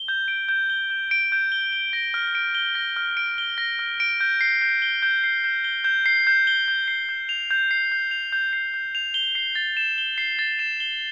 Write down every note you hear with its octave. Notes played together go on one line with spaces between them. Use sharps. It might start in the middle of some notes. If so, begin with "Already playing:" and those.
Already playing: G7
G6
D7
G6
G7
G6
D7
G6
G7
G7
A#6
F6
D7
G7
A#6
F6
D7
G7
A#6
F6
D7
G6
C7
G6
G7
G6
C7
G6
G7
G6
C7
G6
G7
G6
C7
G6
F7
G6
C7
G6
F7
G6
C7
G6
F7
G7
C7
A6
E7
G7
C7
A6
E7
G7